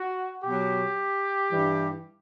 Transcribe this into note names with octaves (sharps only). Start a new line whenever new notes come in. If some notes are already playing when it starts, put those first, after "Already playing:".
Already playing: F#4
B2 G4
F#3
G2 E3 G3